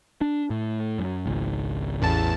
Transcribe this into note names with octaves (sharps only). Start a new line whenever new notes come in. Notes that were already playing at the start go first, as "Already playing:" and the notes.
D4
A2
F#2
G#1 C#2
A1 E2 A5